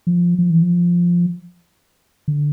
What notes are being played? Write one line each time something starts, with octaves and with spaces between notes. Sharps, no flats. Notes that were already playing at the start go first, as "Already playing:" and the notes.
F3
F3
E3
F3
D3